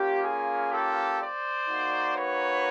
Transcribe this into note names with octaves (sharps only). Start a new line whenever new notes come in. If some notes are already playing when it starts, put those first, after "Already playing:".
Already playing: A#3 C#4 F4 G4
G#4
G4 A4
C5 D5
A#3 D#4 F#4
B4 C#5